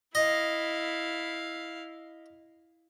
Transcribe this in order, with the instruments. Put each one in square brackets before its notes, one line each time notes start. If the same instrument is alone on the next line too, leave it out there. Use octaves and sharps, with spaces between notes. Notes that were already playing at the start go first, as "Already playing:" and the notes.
[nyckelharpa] E4 F5 [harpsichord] D#5